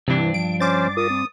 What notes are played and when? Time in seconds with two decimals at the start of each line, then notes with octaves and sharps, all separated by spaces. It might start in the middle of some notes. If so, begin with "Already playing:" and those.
0.08 G2 C3 E3 D4
0.34 F3 D7
0.60 C#4 C5 D6 A6
0.97 F4 A#4 D#6
1.10 C4